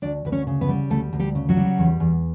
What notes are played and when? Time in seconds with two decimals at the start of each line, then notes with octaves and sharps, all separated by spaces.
0.02 D2 D4 D5
0.25 D2 B4
0.32 C#4 C#5
0.47 C#3
0.61 B3 B4
0.69 G3
0.90 D2 A3 A4
1.13 D2
1.20 G3 G4
1.35 C#3
1.49 F#3 F#4
1.57 G3
1.78 E2
2.00 E2